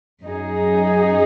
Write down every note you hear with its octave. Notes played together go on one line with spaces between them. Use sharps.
F#2 F#3 D#4 G#4